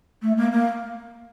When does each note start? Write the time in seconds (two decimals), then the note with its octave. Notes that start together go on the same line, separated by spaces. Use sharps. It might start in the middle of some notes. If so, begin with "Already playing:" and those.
0.22 A3
0.37 A#3
0.52 A#3